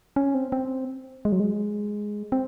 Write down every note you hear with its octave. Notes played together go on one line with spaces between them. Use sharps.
C#4
C4
C4
G#3
F#3
G#3
C4